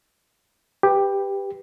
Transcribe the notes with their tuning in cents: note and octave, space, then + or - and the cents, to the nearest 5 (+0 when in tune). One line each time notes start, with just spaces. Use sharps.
G4 +10 B4 +0